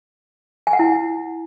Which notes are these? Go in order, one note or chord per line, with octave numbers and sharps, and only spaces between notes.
G#5
F#5
E4